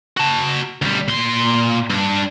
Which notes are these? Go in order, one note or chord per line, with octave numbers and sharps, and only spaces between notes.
F#4 A5
D2 G3
A#2 C6
G2 D4